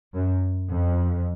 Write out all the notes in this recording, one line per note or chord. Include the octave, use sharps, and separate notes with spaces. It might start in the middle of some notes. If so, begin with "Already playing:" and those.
F#2
F2